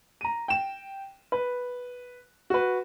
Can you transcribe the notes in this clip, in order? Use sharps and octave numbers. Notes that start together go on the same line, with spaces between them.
A#5 D#7
G5 E7
B4
F#4 B4